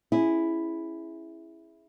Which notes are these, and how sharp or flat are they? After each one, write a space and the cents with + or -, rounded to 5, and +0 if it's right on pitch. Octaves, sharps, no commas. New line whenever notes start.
C#4 -30 E4 +0 G#4 +0